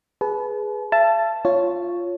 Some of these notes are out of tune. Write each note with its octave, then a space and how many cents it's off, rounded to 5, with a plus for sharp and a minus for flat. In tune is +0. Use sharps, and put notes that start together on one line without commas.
G#4 +0 B4 -5 A5 -40
E5 +40 A5 +0
F4 +0 C#5 +0